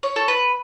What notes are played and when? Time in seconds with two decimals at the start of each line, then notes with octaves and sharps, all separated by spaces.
0.03 C#5
0.16 A4
0.28 B4